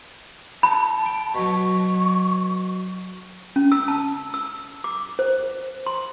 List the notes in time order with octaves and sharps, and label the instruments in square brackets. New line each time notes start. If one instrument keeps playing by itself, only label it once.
[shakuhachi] A5 [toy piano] B5
[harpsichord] G5
[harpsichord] B2 F#3 [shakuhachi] C#6
[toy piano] C#4
E6
A5
E6
D6
C5
C6